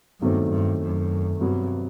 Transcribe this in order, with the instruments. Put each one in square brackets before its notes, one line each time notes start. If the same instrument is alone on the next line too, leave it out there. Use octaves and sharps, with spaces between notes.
[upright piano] E2 D#3 F#3 A3 C4 [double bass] G2
[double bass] G2
F#2
[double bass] G2 [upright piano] C3 F#3 B3